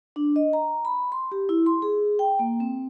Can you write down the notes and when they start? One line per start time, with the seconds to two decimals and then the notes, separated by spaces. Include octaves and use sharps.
0.16 D4
0.36 D#5
0.53 A#5
0.85 B5
1.12 C6
1.32 G4
1.49 E4
1.66 C6
1.82 G#4
2.19 G5
2.39 A#3
2.60 C4